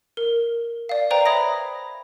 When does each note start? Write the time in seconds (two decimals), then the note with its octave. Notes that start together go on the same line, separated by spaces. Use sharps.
0.17 A#4
0.89 D5 F5
1.11 B4 C5 D5 F5 G5 A#5
1.26 C#5 E5 B5 D#6 A#6